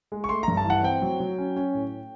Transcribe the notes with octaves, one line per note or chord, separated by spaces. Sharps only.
G#3
C#6
A3 C6
G2 A#5
A5
E3 F#5
C4 G5
F#3
F#3
C#4
C#4
A2